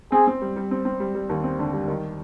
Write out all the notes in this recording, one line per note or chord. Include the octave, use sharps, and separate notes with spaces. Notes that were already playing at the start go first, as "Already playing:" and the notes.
C4 G#4
C4
G3
G3
C4
C4
G3
G3
D#2
C4
D3
G3
D#3